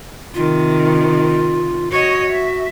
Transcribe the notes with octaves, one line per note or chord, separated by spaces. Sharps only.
C3 D#3 F4
F#4 C#5 D#5
E5